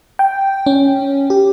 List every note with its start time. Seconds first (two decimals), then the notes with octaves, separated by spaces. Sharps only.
0.19 G5
0.66 C#4
1.30 G4